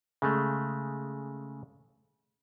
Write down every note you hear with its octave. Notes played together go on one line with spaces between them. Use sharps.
C#3 G#3 A3